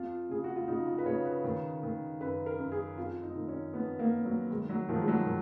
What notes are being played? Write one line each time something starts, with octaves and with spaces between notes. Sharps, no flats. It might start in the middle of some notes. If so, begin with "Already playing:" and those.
Already playing: F2 F4
C#3 G#4
F#4
F4
C#3 D#4
F4
B4
C#3 C#5
B4
D#3
D#3
F#2 B4
A#4
F#2
G#4
F2 F4
D#4
D#3
C#4
F2 B3
A#3
F2
F#3
D#3 G#3
F#3
D#3 F3
G#3
F#3
D#3